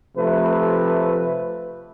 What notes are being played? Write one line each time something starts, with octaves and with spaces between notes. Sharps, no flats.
C3 F3 A3 B4